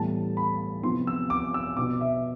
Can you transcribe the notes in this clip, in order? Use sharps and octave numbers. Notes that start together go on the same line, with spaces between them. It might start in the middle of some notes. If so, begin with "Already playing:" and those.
Already playing: A2 E3 G3 B3 A5
B5
C3 F3 B3 C6
E6
D6
E6
B2 B3 D6
E5